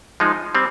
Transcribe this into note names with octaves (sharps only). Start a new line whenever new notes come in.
F3 G#3 D#4
G3 C4